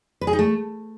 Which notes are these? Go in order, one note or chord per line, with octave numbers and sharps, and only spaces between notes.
B4
G#4
D#4
A3